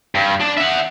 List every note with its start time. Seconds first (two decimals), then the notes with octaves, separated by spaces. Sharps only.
0.15 G2
0.40 D4
0.57 E5 F#5